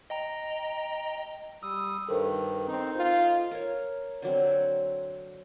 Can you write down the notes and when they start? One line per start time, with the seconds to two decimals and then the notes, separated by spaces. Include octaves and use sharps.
0.10 D#5 G5 A#5
1.63 G3 D#6 E6
2.09 G2 D#3 A4 A#4 C5
2.68 C4 D#4
2.96 F4
3.51 A#4 C#5
4.22 D3 F#3 C4